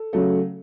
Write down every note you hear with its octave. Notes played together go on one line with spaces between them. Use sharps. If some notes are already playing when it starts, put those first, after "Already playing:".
Already playing: A4
C#3 F#3 A3